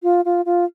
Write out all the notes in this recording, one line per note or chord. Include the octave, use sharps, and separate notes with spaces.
F4
F4
F4